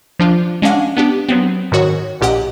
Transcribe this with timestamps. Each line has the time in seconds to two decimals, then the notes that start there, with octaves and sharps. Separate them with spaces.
0.19 F3 D4 F4
0.62 G#3 C#4 D4 F5 F#5
0.97 B3 D4 G4
1.29 F#3 B3 C4
1.72 G#2 D#3 F#4 C#5
2.21 A#1 A#2 G4 D#5 F#5